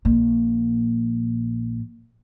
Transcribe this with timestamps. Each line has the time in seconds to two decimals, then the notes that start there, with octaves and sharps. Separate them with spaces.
0.05 A#1 A#2